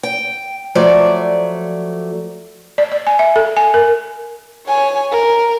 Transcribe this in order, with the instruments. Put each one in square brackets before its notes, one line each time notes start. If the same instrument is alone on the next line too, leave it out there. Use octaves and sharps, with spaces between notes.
[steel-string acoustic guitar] G5
F3 F#3 A3 D5
[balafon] D5
D5
G#5
E5
A4
G#5
A#4
[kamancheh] C#5 G#5
A#4